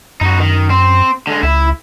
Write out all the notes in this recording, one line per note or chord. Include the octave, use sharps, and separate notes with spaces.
F#2 D#4 F#4
D#3
C4
D3 G#3
C#2 E4